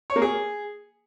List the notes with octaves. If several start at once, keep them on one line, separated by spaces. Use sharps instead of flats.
C#5
A#3
G#4